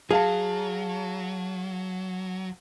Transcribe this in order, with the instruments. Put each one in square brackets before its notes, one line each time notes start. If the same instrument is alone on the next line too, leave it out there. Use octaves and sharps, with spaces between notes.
[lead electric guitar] F#3 [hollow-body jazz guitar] G#4 [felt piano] F5 A5